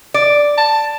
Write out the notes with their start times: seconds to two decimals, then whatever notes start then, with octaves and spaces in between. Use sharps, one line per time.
0.14 D5
0.58 A5